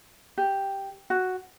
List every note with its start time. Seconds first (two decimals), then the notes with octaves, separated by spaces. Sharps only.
0.38 G4
1.10 F#4